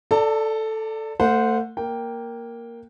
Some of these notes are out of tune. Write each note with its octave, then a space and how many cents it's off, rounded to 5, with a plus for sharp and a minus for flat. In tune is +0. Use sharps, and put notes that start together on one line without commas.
A4 +0 D5 +0 A5 +40
A3 +30 C5 -15 F#5 -20
A#3 +0 G5 +0